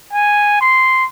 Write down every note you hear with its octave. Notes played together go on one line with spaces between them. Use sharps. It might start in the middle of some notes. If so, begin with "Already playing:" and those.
G#5
C6